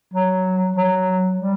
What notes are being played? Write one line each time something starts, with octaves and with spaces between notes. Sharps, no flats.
F#3
F#3
G3